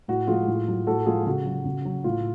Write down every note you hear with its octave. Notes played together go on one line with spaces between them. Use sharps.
A2 F#4
F3 G#3 F4 G#4
A2
F#3
A2 F#4 A4
F3 G#3 F4 G#4
C#3 F#4
F#3
C#3
F#3
A2 F4